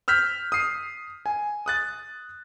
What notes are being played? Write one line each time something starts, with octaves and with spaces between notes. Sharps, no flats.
E6 F6 G6 B6
D#6 C7
G#5
D#6 F#6 A6